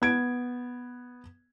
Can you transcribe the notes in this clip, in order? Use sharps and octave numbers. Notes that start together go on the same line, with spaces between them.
B3 G#6 D7